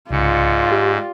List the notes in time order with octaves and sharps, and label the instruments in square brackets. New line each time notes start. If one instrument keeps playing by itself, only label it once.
[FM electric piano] C2 C#3 C#7 [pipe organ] G#2 [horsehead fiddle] F4 D5
[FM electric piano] G4